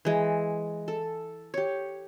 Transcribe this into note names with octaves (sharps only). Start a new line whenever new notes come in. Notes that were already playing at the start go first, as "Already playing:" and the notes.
E3 G#3
A4
G4 C#5